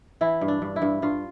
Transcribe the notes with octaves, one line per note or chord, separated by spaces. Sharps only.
E3 E4
G2
D4
G2
E4
G2
G2 F4